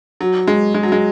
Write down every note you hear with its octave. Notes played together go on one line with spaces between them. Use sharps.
F#3
G#3
G#3
F#3
G#3